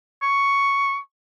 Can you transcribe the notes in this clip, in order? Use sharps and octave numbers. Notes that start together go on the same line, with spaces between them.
C#6